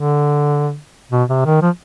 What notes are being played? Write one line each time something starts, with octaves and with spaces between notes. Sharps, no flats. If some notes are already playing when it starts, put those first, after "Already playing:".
Already playing: D3
B2
C3
D#3
F3